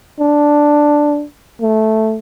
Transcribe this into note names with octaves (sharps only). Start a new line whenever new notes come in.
D4
A3